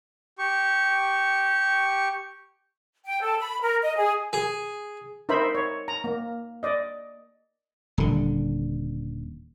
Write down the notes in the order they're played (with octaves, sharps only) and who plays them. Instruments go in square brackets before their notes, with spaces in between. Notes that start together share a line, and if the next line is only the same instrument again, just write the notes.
[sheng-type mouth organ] G4 C#6
[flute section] G5
A4
B5
A#4
D#5
G#4
[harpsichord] G#4
[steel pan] D#4 A#4 C5 E5 B5
C#5
A#5
A#3
D5 D#5
[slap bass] D#1 D3